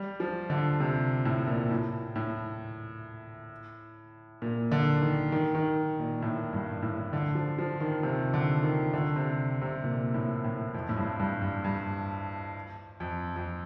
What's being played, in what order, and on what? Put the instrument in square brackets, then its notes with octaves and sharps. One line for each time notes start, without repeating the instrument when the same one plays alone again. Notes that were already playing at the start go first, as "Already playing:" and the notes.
Already playing: [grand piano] G3
F3
D3
C3
A2
A#2
A2
A2
A#2
D3
D#3
D#3
D#3
A#2
A2
G2
A2
D3
F3
F3
D#3
C3
D3
D#3
D3
C3
C3
A#2
A2
A2
F2
A2
G2
G2
G2
G2
F2
F2